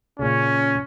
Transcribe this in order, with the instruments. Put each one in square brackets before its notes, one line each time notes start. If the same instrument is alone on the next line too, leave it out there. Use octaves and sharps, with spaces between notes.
[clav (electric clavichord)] A#2 C#3 [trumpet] C#4